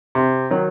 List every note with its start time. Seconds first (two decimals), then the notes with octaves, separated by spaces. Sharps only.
0.15 C3
0.50 D#3 F#3